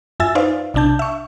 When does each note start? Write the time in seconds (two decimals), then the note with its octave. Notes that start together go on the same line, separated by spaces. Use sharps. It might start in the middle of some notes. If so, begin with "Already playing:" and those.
0.20 F#2 F4 E5 G#5 E6 A6
0.35 D#4 B4 C5 D5 F5
0.74 B1 C3 D4 A5 G6
0.99 E5 C#6